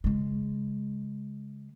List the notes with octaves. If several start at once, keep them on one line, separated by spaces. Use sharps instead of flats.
C#3 G#3